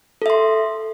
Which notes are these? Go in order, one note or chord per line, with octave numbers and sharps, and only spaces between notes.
A4 E5 C6